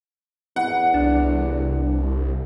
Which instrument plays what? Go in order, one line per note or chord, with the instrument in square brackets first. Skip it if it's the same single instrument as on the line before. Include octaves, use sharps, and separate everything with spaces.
[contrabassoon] E2 [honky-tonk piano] F#5
[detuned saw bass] C2 [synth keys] D4